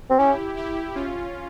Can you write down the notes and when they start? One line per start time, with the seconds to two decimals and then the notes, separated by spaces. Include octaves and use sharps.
0.10 C4
0.18 C#4 E4 G4
0.57 E4 G4
0.95 C#4 F4